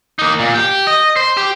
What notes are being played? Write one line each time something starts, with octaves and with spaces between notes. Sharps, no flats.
A#3 D#4
A#2
G4
D#5
C5
G4